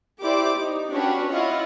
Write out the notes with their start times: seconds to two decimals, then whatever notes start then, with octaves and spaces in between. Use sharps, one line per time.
0.22 E4 G4 C5 D5 D6
0.57 D#4
0.91 C#4 D4 F#4 G4 B4 C#5
1.32 E4 F4 C#5 D#5 F#5